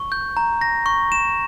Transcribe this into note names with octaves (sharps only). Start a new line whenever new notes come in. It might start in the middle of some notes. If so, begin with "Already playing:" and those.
Already playing: C#6
G6
A#5
A#6
C#6
E7